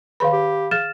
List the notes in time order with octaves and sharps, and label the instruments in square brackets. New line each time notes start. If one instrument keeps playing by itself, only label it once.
[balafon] D#3 G#4 B4 [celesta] F5 B5
[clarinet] G4
[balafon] G#4 F5 [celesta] F6 A6 E7